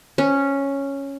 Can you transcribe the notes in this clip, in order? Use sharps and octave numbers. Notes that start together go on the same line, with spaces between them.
C#4